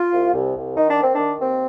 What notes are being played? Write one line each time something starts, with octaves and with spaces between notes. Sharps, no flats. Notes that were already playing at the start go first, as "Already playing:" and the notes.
Already playing: F4
C2
C2
C2
D#3 D#4
D4
A#3 C4
D#3 D4
D#2 C4